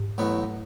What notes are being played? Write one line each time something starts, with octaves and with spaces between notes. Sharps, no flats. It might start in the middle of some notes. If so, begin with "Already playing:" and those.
Already playing: G#2
A1 A2 F#3 B3